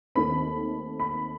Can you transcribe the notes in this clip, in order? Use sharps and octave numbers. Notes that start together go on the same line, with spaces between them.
D#2 D#3 A3 C4 B5
B5